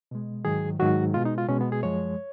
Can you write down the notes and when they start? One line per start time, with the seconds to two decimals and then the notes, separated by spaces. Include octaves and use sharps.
0.11 B2 G#3
0.45 G#2 D#3 F#3 G#4
0.79 G#2 D#3 F#3 F#4
1.14 B2 G#3 F4
1.25 D#4
1.38 F4
1.49 B2 G#3 C#4
1.61 B3
1.72 G#4
1.83 F#2 F3 G#3 C#5